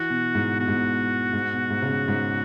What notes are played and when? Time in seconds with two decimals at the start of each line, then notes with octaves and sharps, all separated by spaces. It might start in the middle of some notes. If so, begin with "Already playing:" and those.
Already playing: E3 F#4
0.10 B2
0.35 G#2
0.60 B2 F#4
0.68 G#2
0.76 B2
1.33 G#2
1.53 B2
1.70 G#2
1.82 C#3
1.89 B2
2.08 G#2